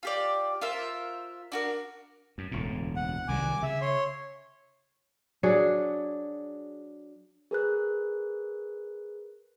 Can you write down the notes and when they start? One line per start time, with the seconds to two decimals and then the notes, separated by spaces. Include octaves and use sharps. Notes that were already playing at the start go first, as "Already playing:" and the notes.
0.03 F4 G4 D5
0.61 F4 A#4 C5 E5
1.52 D4 F#4 A#4
2.38 F#2
2.52 E1 D2 A2
2.96 F#5
3.28 C2 D#3 G3 G#5 D6
3.63 C#3 E5
3.81 C#5 C6
5.43 F#3 D4 G#4 F#5
7.51 G#4 A#4 B4 F#6